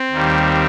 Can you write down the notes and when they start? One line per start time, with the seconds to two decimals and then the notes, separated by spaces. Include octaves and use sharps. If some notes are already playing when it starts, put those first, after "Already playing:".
Already playing: C4
0.11 D#2 D#3 G3